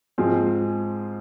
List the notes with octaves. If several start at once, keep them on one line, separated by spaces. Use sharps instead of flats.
G#2 F3 G#3 C4